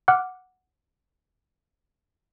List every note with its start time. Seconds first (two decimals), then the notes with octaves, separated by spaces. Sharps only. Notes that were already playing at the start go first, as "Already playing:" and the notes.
0.08 F#5 D6 F6 F#6